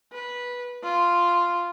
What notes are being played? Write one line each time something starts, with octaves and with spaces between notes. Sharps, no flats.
B4
F4